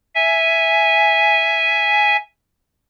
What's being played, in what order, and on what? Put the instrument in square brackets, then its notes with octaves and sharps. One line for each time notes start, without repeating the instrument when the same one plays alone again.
[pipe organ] E5 G#5